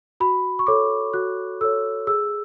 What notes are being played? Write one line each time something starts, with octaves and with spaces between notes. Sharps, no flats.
F#4 B5
C#6
A4 C#5 D6
F#4 F#6
A4 C#5 E6
G#4 E6